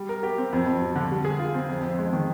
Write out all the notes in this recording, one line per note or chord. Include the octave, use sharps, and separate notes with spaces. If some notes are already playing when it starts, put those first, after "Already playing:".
Already playing: G3
A#4
G4
C4
F2
F2
F3
D3
G3
G#4
F4
C4
F2
F2
G#3
D#3